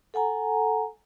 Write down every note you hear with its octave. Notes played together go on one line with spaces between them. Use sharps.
A4 F#5 G#5 A#5